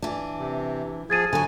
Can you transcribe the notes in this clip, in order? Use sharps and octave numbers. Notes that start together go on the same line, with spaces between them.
E3 D4
C3
F3 G#4 G#6 A6 D#7
D3 F#3 G#5